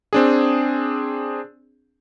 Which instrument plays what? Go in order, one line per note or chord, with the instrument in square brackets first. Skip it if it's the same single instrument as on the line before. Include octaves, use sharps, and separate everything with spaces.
[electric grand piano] C4 D4 G#4